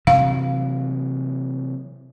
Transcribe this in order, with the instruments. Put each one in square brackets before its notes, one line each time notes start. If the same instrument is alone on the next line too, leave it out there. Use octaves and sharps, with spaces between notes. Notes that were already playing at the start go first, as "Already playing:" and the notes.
[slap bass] C3 E3 F#3 [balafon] F5